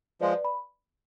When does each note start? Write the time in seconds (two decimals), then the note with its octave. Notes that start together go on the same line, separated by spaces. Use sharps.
0.21 F3 G#3 B4 D5
0.45 B5